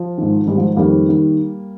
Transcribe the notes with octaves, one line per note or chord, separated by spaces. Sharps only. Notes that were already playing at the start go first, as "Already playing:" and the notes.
Already playing: F3
G#2 D#3
G#2 D#3 G3
F3
F2 D#3 G3 A#3
D#3